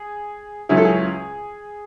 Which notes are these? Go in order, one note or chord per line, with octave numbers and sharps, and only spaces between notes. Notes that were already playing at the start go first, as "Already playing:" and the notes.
Already playing: G#4
C#2 C#3 F#3 C#4 E4 G#4
A4
G#4